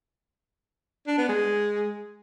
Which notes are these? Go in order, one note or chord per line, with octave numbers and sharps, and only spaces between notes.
D4
B3
G#3